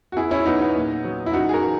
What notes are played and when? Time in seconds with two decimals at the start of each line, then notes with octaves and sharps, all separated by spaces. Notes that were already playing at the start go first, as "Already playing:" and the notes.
0.12 F#4
0.16 E2 E4 G#4
0.31 C#4 E4
0.46 F#3 B3 D#4
0.61 B3 D#4
0.76 A#2
1.05 F#3
1.26 E4
1.33 F#2 D#4 F#4
1.49 G#4
1.53 F#4 A#4
1.63 E3